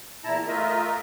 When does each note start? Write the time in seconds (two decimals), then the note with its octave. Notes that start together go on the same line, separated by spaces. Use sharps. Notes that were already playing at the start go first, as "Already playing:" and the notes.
0.24 E2 A#2 E4 A5 A#5
0.47 A3 F4 A#4 D#5 E5